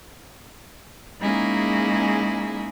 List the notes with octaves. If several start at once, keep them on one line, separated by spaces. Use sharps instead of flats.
G#3 A#3 C#4 D#4 E4 G#4